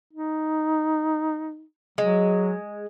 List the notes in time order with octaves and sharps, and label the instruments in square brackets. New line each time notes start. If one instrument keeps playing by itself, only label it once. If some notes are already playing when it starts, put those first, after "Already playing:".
[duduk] D#4
[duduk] F#3 [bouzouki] G#3